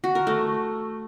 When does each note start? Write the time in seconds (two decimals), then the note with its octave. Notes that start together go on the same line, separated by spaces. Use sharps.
0.04 F#4
0.15 A#4
0.27 A3